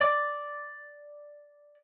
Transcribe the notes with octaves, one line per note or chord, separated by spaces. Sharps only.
D5 D6